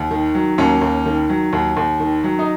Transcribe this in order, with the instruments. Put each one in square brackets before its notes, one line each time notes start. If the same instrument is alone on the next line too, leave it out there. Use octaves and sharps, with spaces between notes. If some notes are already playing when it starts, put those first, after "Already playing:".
Already playing: [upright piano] D#2
D#3
F#3
D#2 A#3 C#4
D#2
D#3
F#3
D#2
D#2
D#3
F#3
D#4